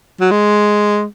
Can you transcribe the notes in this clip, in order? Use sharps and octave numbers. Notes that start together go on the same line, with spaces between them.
F#3
G#3